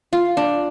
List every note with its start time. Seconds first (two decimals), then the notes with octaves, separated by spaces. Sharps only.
0.13 F4
0.37 D4